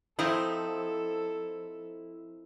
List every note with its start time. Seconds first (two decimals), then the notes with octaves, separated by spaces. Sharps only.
0.19 F3 C4 D#4 E4 A4